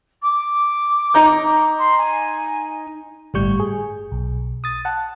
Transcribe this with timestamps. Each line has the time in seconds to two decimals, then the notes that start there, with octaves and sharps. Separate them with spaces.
0.22 D6
1.14 D#4 A#5 G6
1.78 C6
1.98 G#5
3.34 G1 A2 G3 C#6 G6
3.60 G#4
4.12 B1
4.64 D#6 A6
4.85 F#5 A5